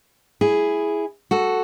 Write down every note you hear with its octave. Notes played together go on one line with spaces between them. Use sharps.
E4 G#4
F#4 A4